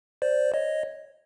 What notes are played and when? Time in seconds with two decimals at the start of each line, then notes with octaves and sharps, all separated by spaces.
0.22 C5 D5
0.54 C#5 D#5